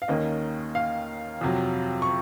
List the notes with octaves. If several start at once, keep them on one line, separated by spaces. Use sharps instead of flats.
F5
D#2 D#3 A#3 C#4 D#5
F5
F2 C3 F#3
C#6